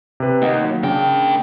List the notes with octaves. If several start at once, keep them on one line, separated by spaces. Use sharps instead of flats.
C3 B4
D#2 A#3 D#5 F#5
F#3
C#3 A#3 D4 G5